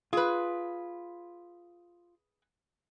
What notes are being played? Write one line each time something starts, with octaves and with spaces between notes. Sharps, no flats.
F4 G#4 B4